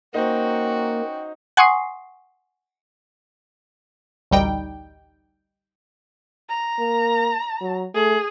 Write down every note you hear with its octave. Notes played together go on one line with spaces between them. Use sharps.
A#3 C#4 D#4 F#4 C5 G5
F#5 G#5 C6 C#6 D#6 C7
A1 D2 G3 D#4 G5
A#5
A#3
F#3
A3 G#4